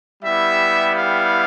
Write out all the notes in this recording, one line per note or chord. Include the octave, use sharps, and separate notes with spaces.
G3 B3 E4 G4 E5
F5